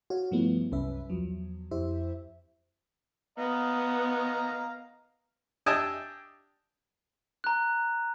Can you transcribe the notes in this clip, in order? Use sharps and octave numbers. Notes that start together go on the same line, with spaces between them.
F#4 C#5 F5
G2 F3 G3 A3 B3 E4
C2 F#2 C#4 B4 E5
E2 F3 F#3
F2 E4 G4 C5 E5
B3 D#5 F5 A#5
D4 G4 D#5 E5 G#5 A5
A#5 F#6